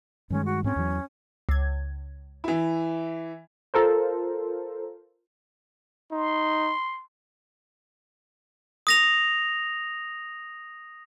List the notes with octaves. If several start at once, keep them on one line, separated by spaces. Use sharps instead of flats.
G2 D#3 G#3 C#4
F#4
G#2 A#3 C4 C#4
E2 E3 F#3
C#2 G#6
E3 E4
F4 A4 A#4 C5
D#4 C6
D#6 A#6 F7